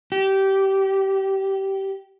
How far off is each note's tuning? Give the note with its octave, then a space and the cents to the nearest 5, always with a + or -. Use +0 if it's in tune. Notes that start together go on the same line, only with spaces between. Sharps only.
G4 -20